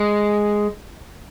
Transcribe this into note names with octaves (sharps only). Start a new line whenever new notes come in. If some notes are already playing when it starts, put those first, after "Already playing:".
Already playing: G#3